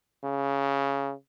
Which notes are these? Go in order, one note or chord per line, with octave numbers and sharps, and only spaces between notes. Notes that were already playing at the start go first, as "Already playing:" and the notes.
C#3